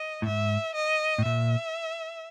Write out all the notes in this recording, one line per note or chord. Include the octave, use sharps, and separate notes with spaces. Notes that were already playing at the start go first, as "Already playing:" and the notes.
Already playing: D#5
A2
G#2 E5
D#5
A2
A#2 E5